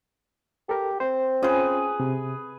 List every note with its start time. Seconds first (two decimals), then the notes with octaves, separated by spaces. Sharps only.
0.69 G4 A4 A#4
1.00 C4 C5
1.43 C#4 F4 G#4 B4 C5
2.00 C3